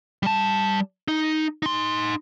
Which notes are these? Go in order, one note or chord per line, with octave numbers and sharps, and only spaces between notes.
G3 A5
D#4
D#4 C6